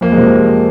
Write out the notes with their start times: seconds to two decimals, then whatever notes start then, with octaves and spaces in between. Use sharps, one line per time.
0.01 F2 A#3
0.12 G#3
0.17 C3 F3